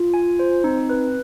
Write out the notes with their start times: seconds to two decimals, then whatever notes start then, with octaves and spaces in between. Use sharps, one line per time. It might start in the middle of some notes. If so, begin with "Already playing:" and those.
Already playing: F4
0.14 G#5
0.39 C5
0.64 C4 D#4
0.90 B4